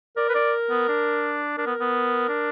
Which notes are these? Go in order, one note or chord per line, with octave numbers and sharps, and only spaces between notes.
A#4 D5
B4
D5
B3
D4
D4 A#4
B3
B3
D4